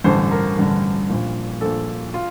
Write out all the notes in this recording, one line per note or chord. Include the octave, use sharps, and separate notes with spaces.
A1 G2 D3 C5
A#4
A1 G2 D3
A#1 A#2
A#1 A#2 A4
F4